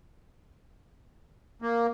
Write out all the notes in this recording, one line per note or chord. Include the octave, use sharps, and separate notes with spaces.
A#3